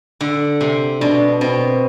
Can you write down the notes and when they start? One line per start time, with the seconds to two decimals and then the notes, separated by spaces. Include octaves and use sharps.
0.21 D3
0.61 C3
1.01 B2 D4
1.41 B2 C4